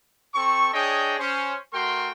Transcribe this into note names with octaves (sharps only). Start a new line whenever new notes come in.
C4 A4 C#6
D4 G#4 C#5 D#5 G5
C#4 C5
A3 F#4 A#4 G5 C6